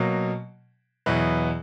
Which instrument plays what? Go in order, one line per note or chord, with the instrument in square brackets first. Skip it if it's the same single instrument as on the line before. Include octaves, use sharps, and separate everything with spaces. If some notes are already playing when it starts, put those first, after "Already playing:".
Already playing: [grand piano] B2 F#3 A#3
E2 B2 F#3 B3 E4